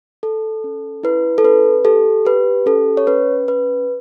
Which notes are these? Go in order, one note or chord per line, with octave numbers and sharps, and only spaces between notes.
A4
C#4
E4 B4
A4
C#4 B4
G4 A4
G4 B4
C#4 A4
C#5
C#4 B4
C#4 B4